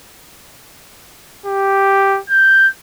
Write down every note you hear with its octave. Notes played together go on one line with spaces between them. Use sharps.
G4
G6